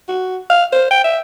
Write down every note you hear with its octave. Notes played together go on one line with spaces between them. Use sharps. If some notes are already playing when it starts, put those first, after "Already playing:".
F#4
F5
C5
G5
E5